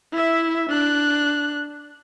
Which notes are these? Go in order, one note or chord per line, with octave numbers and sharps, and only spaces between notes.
E4 E5
D4 F#6